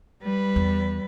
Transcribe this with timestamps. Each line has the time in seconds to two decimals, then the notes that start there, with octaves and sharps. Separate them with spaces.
0.23 G3 B4
0.56 E2